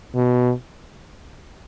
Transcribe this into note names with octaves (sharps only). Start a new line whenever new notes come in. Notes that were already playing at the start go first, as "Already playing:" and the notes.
B2